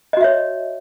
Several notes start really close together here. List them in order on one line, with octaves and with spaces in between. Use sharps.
D#5 F#4 E5 C#5